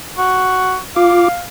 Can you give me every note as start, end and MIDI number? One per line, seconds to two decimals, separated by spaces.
0.18 0.78 66
0.96 1.28 65
0.96 1.44 77
0.96 1.28 86